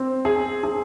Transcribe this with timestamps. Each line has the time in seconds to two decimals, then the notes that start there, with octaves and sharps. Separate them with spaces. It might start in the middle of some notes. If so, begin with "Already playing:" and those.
Already playing: C4
0.25 G#4
0.63 G#4